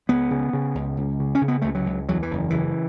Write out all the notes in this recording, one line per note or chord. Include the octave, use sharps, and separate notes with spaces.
C#2 B3
C#3
C#3
C#2
C#2
C#3
C#4
C#3
B3
C#2 A3
F#3
C#2
E2 F#3
E3
F#1
C#3 E3